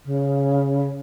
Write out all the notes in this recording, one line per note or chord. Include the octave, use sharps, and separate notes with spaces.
C#3